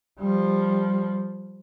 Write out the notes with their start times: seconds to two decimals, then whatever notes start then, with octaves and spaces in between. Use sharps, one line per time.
0.20 F3 G3